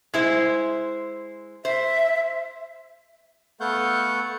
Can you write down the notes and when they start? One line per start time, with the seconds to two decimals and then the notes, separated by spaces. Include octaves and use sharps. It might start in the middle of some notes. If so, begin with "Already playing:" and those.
0.14 G#3 E4 C5
1.65 C5 E5
3.60 A3 B3 F5 F#5 C#6 G6